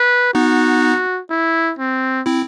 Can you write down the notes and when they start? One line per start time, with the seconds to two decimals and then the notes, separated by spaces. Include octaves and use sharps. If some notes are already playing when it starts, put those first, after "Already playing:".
Already playing: B4
0.34 B3 D#4 F#4
1.30 E4
1.78 C4
2.26 C4 E4